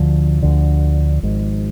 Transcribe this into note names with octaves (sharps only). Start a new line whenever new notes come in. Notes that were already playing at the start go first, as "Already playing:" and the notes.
Already playing: D2 D3 F3
D2 D3
G#1 G#2